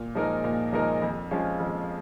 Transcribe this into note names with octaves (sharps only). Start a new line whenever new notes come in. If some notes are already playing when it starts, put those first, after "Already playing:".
Already playing: A#2
F3 G#3 D#4 A#4
A#2
F3 G#3 D#4 A#4
F2
F3 G#3 C#4 F4
F2